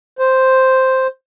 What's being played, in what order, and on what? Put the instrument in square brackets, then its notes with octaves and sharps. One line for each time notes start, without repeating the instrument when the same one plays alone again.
[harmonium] C5